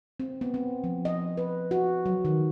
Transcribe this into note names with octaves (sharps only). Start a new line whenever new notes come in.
C4
B3
C4
F3
D#5
B4
F#4
F#3
D#3